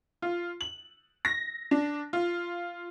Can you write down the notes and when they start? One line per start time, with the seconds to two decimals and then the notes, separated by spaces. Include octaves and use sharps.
0.22 F4
0.61 F#7
1.25 A#6
1.71 D4
2.13 F4